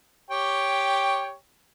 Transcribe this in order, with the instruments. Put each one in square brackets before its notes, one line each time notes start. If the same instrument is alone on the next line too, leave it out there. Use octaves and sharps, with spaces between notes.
[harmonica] G4 C#5 G5